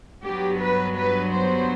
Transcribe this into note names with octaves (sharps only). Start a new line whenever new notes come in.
G2 F#3 B3 G4
B4
B4
C5